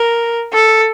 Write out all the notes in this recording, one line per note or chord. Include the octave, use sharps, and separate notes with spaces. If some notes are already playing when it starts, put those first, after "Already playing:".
Already playing: A#4
A4